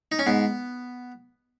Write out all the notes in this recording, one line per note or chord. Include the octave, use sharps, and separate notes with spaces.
D#4
C#4
G#2 B3